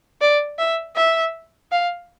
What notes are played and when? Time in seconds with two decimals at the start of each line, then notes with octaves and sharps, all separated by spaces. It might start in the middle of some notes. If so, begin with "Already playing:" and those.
0.21 D5
0.59 E5
0.97 E5
1.72 F5